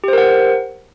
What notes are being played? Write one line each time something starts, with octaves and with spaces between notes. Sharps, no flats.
G4 A#4 C5 F#5